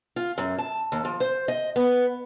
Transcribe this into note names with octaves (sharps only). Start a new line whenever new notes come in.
F4
F#2
A5
D#2
F3
C5
D#5
B3